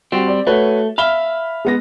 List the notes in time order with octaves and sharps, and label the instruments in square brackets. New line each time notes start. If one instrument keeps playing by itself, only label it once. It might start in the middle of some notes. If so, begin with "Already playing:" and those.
[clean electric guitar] G3 C4 [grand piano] F#4
[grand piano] D5
[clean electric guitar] A3 [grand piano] F#4 B4 C#5
[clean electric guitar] E5 F5 [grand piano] B5 F6 G7
[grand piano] G#3 B3 A#6